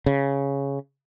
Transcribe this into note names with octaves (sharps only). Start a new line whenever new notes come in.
C#3